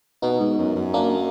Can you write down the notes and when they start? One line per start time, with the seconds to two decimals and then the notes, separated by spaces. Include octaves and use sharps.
0.22 B2 B3 D#4
0.40 G#2
0.58 F#2
0.76 F#2
0.94 A#3 D4